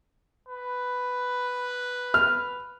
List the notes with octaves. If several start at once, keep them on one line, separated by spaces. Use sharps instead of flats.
B4
F6